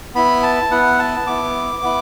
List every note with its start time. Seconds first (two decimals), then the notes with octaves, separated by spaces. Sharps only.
0.15 B3 E4 B5
0.43 A5
0.71 B3 E4 F#5
0.99 A5
1.26 B3 E4 D6
1.83 B3 E4